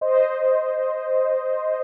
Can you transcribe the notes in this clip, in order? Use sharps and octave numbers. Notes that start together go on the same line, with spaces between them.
C5 D#5